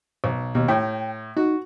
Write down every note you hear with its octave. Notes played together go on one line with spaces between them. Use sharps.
B1
D#2 B2
A2 G5
D#4 F#4